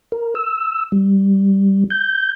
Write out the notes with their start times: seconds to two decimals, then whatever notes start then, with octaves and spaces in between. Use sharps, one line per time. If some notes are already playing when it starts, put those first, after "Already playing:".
0.12 A#4
0.35 E6
0.92 G3
1.90 G6